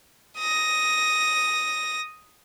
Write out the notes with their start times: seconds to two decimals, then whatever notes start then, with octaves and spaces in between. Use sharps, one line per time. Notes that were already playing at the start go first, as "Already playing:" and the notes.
0.38 D#6 A#6